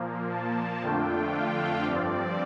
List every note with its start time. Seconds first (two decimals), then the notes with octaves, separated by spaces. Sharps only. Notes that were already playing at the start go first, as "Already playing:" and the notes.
Already playing: A#2 F3 A#3
0.30 A5
0.81 F2 D3 A3 D4 F4 G5
1.32 F5
1.84 G2 F3 C4 D5